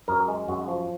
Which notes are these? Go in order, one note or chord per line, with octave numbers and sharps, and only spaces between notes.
F#2 A#4
G#3
F#2 F#4
F3